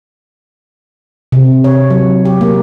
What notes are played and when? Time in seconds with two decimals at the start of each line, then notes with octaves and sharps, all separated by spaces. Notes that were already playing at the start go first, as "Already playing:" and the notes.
1.32 C3
1.64 C#5
1.90 F#3
2.25 G4
2.41 A#3